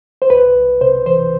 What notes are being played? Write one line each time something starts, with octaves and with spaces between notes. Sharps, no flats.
C5
C2 B4
C2
C3 C5
E3 C5